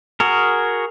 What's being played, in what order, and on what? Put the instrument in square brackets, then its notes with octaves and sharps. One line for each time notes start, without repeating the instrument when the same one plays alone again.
[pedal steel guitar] F#4 G#4 A#4